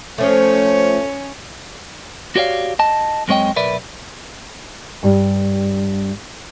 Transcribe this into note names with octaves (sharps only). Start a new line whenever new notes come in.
F3 A3 C#4 C#5
F#4 G4 C#5 D5 F5
D#5 A5
F#2 G#3 C4 C#5 D#5 G5
B1 A#4 B4 D5 E5
G2 G3